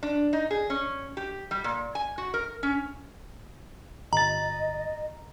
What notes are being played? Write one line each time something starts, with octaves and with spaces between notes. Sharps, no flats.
D4
D#4
G#4
C#4
G4
G3
A#2
G#5
F#4
A#4
C#4
G1 D#5 A#5 A6